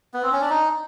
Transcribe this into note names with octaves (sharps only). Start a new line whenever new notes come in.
B3
C4
C#4
D4
D#4